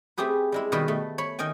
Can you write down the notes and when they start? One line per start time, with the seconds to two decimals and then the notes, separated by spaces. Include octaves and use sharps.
0.17 A3 C4 G4 G#4 B4
0.52 G3 G#3 E4
0.72 B2 D#3 G3 B4 D#5 E5
0.88 A3
1.18 C#5 B5
1.39 D#3 D#5 G5 G#5